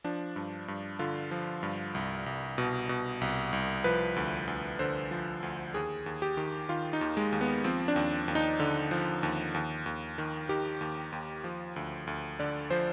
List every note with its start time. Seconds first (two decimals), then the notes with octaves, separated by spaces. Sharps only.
0.04 F3 D4
0.36 G2
0.68 G2
0.99 D3 F4
1.31 F3
1.63 G2
1.95 C2
2.26 C2
2.58 B2
2.89 B2
3.21 C2
3.53 C2
3.84 F3 B4
4.16 D2
4.47 D2
4.79 D3 C5
5.11 F3
5.43 D2
5.74 D#2 G#4
6.06 D#2
6.22 G4
6.37 D#3
6.69 D#3 F4
6.93 D#4
7.01 D#2
7.17 G#3
7.32 D#2
7.41 B3
7.64 F3 C4
7.88 D4
7.96 D#2
8.28 D#2
8.35 D#4
8.60 D3
8.91 F3
9.23 D#2
9.54 D#2
9.86 D#2
10.18 D#3
10.49 D#3 G4
10.81 D#2
11.12 D#2
11.44 F3
11.76 D2
12.07 D2
12.39 D3 D5
12.70 F3 C5